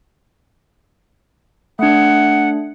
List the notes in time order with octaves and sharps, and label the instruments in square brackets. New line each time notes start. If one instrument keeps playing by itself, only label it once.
[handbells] A3 D4 [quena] F#5